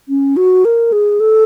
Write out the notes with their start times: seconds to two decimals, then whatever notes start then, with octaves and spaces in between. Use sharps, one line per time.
0.08 C#4
0.36 F#4
0.65 A#4
0.92 G#4
1.20 A4